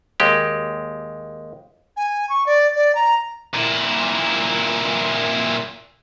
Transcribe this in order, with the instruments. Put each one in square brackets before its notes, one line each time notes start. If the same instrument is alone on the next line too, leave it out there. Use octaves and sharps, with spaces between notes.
[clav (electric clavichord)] D#2 G#3 G4
[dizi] G#5
C#6
D5
D5
A#5
[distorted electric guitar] A#2 E4